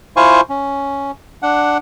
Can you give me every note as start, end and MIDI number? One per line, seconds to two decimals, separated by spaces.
0.17 0.41 64
0.17 0.41 65
0.17 0.41 72
0.17 0.41 77
0.17 0.41 80
0.17 0.41 85
0.49 1.11 61
1.42 1.77 62
1.42 1.77 78